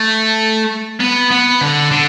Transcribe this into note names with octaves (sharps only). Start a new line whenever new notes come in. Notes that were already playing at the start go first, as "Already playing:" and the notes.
Already playing: A3
B3
B3
D3
D3